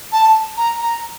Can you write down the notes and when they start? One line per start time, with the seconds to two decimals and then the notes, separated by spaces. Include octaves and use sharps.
0.12 A5
0.57 A#5
0.82 A#5